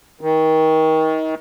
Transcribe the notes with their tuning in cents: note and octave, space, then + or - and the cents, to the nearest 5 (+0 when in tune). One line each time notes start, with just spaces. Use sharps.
D#3 +30